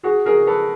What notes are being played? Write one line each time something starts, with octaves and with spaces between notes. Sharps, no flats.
F#4 G#4
G#4 A#4
A4 B4